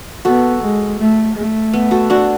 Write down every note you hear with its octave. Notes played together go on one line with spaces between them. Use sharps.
B3 F#4 A4
G#3
A3
A3
B3
F#4 A4
D4 F#4